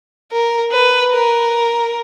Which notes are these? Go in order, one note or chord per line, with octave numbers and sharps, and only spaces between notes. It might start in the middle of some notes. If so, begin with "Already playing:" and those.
A#4
B4
A#4